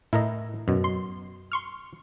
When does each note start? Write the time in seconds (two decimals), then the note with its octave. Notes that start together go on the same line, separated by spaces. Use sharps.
0.13 A2 E4 A#4 D#5
0.68 F#2 B2
0.84 C6
1.52 C6 C#6 F6